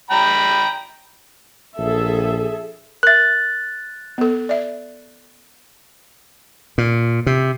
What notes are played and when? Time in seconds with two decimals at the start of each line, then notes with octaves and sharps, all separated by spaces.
0.11 G5 A#5 B5
1.78 A#1 G#4 A4 E5
3.03 A#4 E5 F#6 A6
4.18 B3 A4
4.49 D5 E5
6.78 A#2
7.26 C3